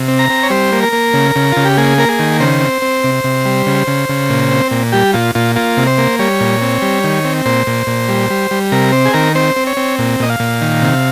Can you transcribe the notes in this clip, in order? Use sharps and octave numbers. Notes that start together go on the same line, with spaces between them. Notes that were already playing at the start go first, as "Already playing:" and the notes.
Already playing: C3
C4
A#5
C4
C#5
G3 C5
A#3
A#4
A#3
C#3
C#3
C#3 F4
G4
A#3 G#4
A#3 A#4
G#4
D#3
C#3 C5
C4
C4
C3
C3
G3
C#3
C#3
C#3
A#2
C4
A#2
G3 G4
A#2 F4
A#2 F4
A#3 F4
C3
C5
A#3
G3 C#5
A#2
C4
G3
D#3
C4
A#2 C5
A#2
A#2
G3
G3
G3
C3 A#4
C4 C5
G#4
D#3 A#4
C4 C5
C4
C#5
C4
A#2
A#2 D#5
F5
A#2
D#3
C3